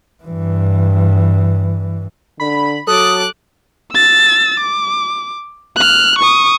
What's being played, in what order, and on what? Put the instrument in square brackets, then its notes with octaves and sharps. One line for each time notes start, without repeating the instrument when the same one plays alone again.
[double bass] G2 E3
[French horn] D3 [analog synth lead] B5
[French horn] F#3 [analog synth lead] A4 [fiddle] D6 F#6 [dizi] D#6
[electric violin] E6 A6
D6
F6 F#6
C#6 D#6